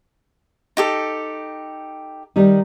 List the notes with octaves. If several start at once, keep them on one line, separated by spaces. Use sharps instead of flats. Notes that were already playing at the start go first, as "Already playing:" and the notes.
D#4 G4 A4
D#3 G3 D#4